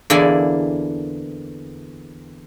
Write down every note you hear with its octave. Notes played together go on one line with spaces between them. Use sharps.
E2 D3 A#3 E4 D5 G#5